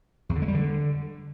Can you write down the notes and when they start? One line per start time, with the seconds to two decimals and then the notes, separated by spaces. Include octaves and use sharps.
0.29 E2
0.36 D3
0.42 G#3
0.48 G3
0.54 D3